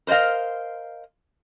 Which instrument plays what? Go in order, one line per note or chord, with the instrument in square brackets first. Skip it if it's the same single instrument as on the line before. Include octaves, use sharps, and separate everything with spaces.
[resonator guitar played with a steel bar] A#4 C5 D5 D#5 F5